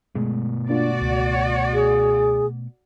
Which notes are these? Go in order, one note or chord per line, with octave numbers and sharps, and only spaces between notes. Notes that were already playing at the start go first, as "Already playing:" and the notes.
B2 G#3 A3 B3
A#3 D4 F4 F#4 D5
C#2
G#4